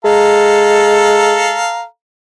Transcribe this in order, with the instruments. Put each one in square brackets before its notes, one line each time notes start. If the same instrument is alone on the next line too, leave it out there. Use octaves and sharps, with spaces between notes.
[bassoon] G#3 [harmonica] A4 F5 A#5